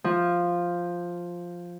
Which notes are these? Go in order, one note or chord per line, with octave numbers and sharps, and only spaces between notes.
F3